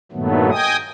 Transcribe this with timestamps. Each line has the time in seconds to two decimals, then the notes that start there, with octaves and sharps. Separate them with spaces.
0.12 G2 A#2 D#3 F#3 A3 B3
0.51 D#5 G5 G#5 D#6